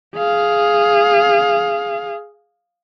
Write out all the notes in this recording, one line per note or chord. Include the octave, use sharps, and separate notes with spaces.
G#4 F5